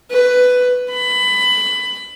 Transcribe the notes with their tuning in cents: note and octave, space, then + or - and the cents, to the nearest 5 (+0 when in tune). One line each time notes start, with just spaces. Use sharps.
B4 +10
B5 +20